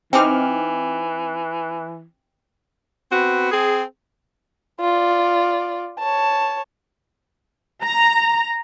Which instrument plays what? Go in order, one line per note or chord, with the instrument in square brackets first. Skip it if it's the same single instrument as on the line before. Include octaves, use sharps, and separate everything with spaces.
[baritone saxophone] E3 [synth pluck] C4 D#4 F6 [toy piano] G5 G#5 D6
[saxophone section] B3 C4 F#4
C4 G#4
[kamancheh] F4 D5
C#5 A5
[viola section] A#5